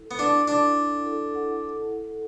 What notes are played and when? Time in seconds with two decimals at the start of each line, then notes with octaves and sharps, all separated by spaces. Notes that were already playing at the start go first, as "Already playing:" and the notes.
Already playing: E4 A4
0.11 B3
0.19 D4 F#5
0.48 D4 E4
0.77 E4
1.06 A4
1.35 F#5
1.64 A4
1.92 F#5